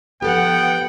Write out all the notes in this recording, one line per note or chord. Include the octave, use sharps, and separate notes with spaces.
F3 B3 G4 A4 F#5 G5